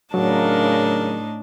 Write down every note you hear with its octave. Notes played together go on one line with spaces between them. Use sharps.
A2 C#3 F#3 D4 D#4 A#4 A5